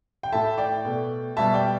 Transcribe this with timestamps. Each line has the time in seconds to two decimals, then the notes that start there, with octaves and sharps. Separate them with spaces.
0.23 G5
0.32 A2 A3 E5 A5
0.58 D5 G5
0.85 B2 A3
1.37 B2 G3 E5 A5
1.54 D5 G5